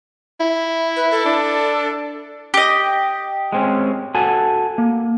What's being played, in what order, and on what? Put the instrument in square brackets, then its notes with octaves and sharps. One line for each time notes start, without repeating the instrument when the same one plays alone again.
[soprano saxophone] E4
[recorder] B4
A4
[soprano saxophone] D4
[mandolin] G4 D#5
[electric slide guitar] G#3 C4 C#4
F#4 A4 G#5
A#3